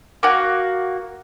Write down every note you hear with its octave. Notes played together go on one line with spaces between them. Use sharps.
A#3 F#4